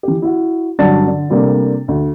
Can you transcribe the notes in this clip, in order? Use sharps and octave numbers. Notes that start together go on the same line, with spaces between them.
E3 G4
E4 F#4
G2 D3 F#3 D5 A5 A6
D3
C3 G3 A3 A#3 D4
D2